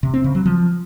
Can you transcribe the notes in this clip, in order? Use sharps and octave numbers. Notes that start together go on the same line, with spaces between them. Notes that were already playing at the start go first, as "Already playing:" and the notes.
C3
C4
C#3
F#3
F3